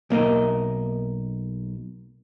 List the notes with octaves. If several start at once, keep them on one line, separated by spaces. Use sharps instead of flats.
B1 A#3 A#4 D#5